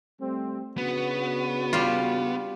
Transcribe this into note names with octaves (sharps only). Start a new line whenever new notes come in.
G3 A3 C4
C#3 B3 D4 F#4
G3 F4